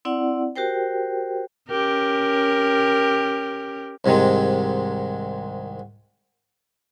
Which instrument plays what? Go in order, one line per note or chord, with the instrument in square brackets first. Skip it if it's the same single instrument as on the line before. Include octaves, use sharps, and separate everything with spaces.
[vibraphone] C4 E4 D5 F#5
F#4 G4 A#4 C5 G5
[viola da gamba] C#4 G4 A#4
[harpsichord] C2 G#2 C3 D#3 G#3